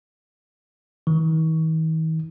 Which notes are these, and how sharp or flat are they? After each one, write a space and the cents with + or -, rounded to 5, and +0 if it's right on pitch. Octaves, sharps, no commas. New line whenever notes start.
D#3 +45